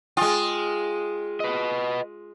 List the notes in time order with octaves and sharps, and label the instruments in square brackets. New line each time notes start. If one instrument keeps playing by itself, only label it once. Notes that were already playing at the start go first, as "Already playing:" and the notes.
[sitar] G#3 F4 [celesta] G5 G#5 D#6
[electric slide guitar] B4 D#5